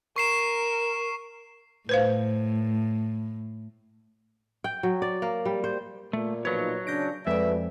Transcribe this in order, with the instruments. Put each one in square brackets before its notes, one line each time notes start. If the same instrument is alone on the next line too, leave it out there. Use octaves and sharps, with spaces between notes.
[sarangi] A#4 [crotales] C#6 C7 E7
[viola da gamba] A2 [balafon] B4 C5 F5
[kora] G5
F#3
D5
A#3
G3
C5
[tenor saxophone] A#2 [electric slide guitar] A3
[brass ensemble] B1 F3 D#4 [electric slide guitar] F#3 C#5 [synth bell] B4
[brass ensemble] C#3 D4 [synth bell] G6 A#6 D7
[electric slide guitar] F2 [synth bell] G#3 D5 [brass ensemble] A3 F#4 B4 [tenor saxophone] E5